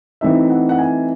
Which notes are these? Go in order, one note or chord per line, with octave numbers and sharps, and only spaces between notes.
E3 A3 C4 D#4 E5
F#5
F#5
G#5